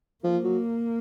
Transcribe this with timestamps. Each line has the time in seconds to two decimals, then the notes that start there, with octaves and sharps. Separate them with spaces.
0.24 F3 A#3
0.44 F#3